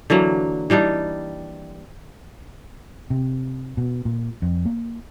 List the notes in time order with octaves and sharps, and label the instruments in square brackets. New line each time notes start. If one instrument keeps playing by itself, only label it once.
[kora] D3 E3 F#3 A#3
E3 G3 D4 D#4
[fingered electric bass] C3
B2
A#2
F2
A#3